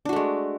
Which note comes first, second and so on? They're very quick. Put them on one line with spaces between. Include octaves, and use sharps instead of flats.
D4 F#4 A3 G#3